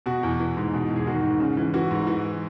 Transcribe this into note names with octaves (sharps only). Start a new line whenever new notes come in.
B2 F#4
E2
E3
G#2
B2
E2
G#4
D#3 F#4
G#2
C#3
E3
E3 F#4
G#2
E3